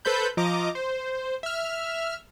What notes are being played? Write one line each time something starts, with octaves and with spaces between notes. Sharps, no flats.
A4 B4 C5 B5 G6
F3 D#5 A#5 D6
C5
E5 F6